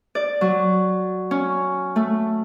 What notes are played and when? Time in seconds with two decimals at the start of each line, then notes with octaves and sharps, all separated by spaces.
0.15 D5
0.41 F#3
1.31 C#4
1.96 A3